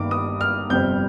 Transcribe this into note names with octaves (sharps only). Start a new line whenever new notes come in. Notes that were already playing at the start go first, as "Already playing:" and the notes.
Already playing: G1 G2 D#3 A#3 D6
D#6
F6
G1 F2 C3 G3 C4 G6